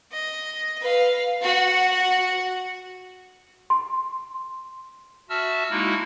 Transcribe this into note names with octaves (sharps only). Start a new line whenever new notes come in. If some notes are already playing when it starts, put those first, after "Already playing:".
D#5
B4 F5
F#4 F#5
C6
F#4 E5 A5 E6 F6
G#3 A#3 D#4 E4 F#4